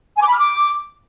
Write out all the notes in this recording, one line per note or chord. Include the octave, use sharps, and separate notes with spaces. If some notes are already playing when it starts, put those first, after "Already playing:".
G#5
D6
B5
F6
D6